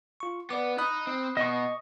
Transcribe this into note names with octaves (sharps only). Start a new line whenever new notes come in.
F4 C#6
B3 B4 D5 D6
D#4 B5 D#6 F#6
C4
B2 D#5 C#6